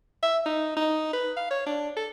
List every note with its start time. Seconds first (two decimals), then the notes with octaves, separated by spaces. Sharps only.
0.23 E5
0.46 D#4
0.77 D#4
1.13 B4
1.37 F5
1.51 C#5
1.67 D4
1.97 A4